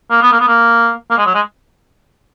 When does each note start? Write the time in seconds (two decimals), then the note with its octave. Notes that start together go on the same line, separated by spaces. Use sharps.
0.11 A#3
0.22 B3
0.32 A#3
0.40 B3
0.48 A#3
1.11 A#3
1.18 G#3
1.26 F#3
1.35 G#3